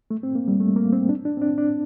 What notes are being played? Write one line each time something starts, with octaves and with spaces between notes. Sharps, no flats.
A3
C4
A#3
G3
A3
A#3
C4
D4
D4
C4
D4
D4